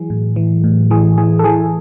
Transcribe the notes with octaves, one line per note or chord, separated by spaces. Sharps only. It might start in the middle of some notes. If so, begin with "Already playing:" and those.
Already playing: E3 F#3 G#4
A2
E3
A2
E3 G#4
E3 G#4
A4
E3 G#4